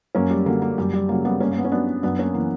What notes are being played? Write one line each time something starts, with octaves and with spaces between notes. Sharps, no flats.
F#2 A#3 C#4
G3
D3 F#3 A#3
A#3
F#2 G3
G3
C#3 F#3 A#3
G3 B3
G2 A#3 C#4
A#3
B3
C#4
F#3 B3 D4
F#2 B3 D4
A#3 C#4
E3 A#3